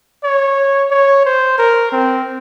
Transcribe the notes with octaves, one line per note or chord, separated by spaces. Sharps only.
C#5
C#5
C5
A#4
C4